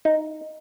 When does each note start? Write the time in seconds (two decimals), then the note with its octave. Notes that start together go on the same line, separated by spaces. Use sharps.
0.05 D#4